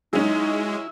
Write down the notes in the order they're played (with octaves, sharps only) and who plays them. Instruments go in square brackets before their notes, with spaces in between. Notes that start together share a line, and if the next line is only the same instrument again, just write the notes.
[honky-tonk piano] F#3 C#4 [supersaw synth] G#3 [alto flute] D#4 [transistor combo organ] E4